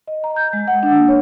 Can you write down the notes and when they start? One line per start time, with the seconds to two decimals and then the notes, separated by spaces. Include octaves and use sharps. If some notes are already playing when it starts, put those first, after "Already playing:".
0.07 D#5
0.24 A#5
0.36 G6
0.53 G#3
0.68 F#5
0.83 D4
0.97 A#3
1.08 C#5